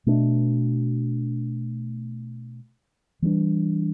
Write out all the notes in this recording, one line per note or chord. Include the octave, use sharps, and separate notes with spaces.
B2 A3 D4
E3 G3 B3 D4